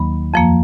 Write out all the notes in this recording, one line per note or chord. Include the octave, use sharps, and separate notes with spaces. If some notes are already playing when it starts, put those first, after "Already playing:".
Already playing: D#2 D#3 F#3 A#3 B5
F2 F3 A#3